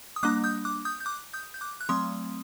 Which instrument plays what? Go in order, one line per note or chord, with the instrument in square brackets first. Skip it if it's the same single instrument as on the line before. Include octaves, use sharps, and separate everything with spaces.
[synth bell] D#6
G3 A#3 D4 D6 F#6
D#6 G6
D6 F#6
D#6 G6
G6
D6 F#6
D#6 G6
G6
D6 F#6
F#6
F#3 A3 C4 C6 D#6